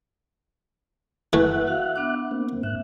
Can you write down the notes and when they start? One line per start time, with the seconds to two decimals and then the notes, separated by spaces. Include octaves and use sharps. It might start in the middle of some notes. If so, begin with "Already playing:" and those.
1.33 E3 A3 E5 F#5 F#6
1.67 F#4 F5
1.96 B3 D4 D6
2.31 A#3 C4
2.63 G#2 E5 F#6